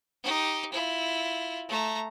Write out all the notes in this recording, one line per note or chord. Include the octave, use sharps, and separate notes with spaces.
D#4 G4
E4 F4
A3 A#5